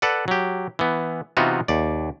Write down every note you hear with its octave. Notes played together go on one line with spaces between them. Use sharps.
A4 B4 D5 F#5
F#3 G4
E3 B3
C3 E3 B3 D#4 F4 F#4
D#2 D5